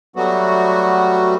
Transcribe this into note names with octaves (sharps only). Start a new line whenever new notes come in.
F#3 G3 A3 B3 F#4